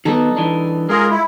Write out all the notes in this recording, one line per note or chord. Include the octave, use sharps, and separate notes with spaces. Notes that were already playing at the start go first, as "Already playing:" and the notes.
D#3 F#3 B3 D#4 A4
E3 D4
G#3 F4 G#4 A#4
E4